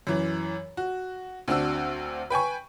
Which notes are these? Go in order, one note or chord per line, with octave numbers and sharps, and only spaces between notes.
F#2 E3
F#4
D2 C4 D4 F#4 E6
B4 G5 G#5 C#6